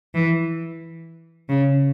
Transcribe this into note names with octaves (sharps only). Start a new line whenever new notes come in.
E3
C#3